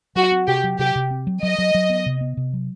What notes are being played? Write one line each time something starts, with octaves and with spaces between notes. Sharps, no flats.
F#3 F#4
C4
C3 G4
F#3
C3 G4
C3
C4
F#3
F#3 D#5
F#3
F#3
B3
C3
B3
C3
F#3